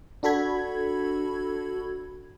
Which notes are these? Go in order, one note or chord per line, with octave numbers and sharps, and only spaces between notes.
D4 F#4 A4 B5 G#6